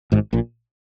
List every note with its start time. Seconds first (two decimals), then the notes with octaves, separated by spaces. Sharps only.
0.12 G#1 G#2
0.33 A#1 A#2